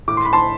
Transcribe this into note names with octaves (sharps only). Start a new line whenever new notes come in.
A2 D6
C6
B5
A5 C6